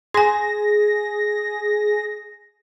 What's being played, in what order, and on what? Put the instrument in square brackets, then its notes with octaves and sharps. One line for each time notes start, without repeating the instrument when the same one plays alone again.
[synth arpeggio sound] G#4 [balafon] G#5 C6 [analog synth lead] A#6